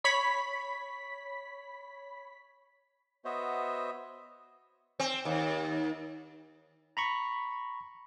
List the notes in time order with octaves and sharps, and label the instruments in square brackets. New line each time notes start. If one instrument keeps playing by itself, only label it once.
[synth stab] C#5 B5 B6
[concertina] B3 F#4 C5 C#5 D#5 E5
[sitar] C4
D#2
[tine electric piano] A#5 B5 C#6